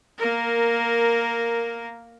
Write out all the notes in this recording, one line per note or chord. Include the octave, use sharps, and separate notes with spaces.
A#3 A#4